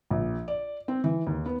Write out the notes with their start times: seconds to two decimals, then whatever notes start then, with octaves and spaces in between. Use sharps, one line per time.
0.11 A#1
0.48 D5
0.88 C4
1.04 E3
1.27 D#2
1.46 B3